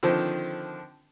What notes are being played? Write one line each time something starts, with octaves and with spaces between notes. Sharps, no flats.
D3 D#3 F3 C4